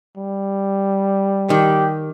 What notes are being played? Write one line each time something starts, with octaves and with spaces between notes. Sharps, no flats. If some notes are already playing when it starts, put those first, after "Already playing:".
G3
D#3 G4